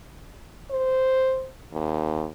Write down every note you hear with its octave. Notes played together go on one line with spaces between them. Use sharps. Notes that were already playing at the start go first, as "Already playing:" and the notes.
C5
D#2